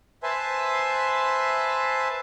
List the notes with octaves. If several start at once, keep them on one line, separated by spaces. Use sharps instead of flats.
B4 C5 E5 G#5 A5 C6